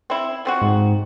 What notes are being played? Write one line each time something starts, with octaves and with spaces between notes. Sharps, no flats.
C4 E4
F3 C4 F#4
G#2